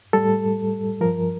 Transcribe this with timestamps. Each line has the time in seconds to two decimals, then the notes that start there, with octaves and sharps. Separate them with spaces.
0.13 A2 G3 A4
1.01 G2 F3 A#4